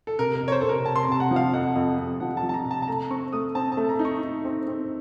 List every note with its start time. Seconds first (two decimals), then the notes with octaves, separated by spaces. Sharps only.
0.07 A4
0.19 C3 A#4
0.35 A#4
0.41 F2
0.48 C#5
0.52 C5
0.61 C3 A4
0.69 A#4
0.86 C3 A5
0.96 C6
1.03 A#5
1.08 C3 A5
1.20 F#5
1.31 F3
1.36 F5
1.53 F2 F#5
1.76 F2
1.98 F2
2.20 F3 F#5
2.37 A5
2.43 F3
2.49 A5
2.54 A#5
2.65 C3
2.71 A5
2.82 A5
2.88 A3 A#5
3.10 C4 C#6
3.33 A3 D#6
3.55 C4 A5
3.72 A5
3.77 A3
3.89 A#5
3.99 D#4
4.05 C#6
4.22 D#4
4.45 C4
4.67 C4